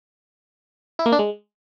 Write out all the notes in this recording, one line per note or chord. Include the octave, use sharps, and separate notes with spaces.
E4
A#3
D4
G#3